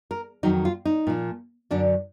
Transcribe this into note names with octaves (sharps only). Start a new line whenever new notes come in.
A#4
F2 D#3 F#3 D#4
F4
D#4
A#2 F3
F#2 D3 F#3 D4